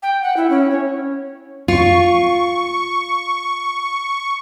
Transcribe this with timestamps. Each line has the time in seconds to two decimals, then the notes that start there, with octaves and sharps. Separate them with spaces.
0.03 G5
0.23 F#5
0.37 E4
0.50 C#4
0.71 C#5
1.68 F4 C#6